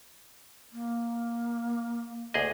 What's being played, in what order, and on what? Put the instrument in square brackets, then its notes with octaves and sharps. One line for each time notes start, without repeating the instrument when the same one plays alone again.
[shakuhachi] A#3
[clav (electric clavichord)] D2 G#4 D#5